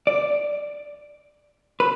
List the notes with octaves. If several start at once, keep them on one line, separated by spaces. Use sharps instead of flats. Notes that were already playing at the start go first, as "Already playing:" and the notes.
D5
B4